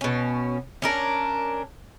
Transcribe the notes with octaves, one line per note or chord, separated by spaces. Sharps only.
B2 C#4
C#4 D4 A#4